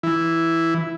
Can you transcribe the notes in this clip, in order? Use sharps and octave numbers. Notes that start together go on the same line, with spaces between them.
E3 E4